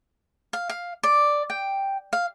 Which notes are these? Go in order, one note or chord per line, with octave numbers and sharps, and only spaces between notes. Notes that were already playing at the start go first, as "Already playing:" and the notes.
F5
F5
D5
G5
F5